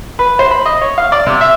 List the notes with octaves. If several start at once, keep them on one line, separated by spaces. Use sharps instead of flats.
B4
C5
B5
D#5
C#5
F5
D5
C3
E5